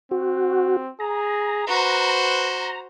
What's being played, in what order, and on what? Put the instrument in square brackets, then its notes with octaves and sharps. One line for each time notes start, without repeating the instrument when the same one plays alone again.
[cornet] C4 [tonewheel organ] F#4
[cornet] G#4 [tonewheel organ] A#5
[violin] F#4 C5 [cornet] B4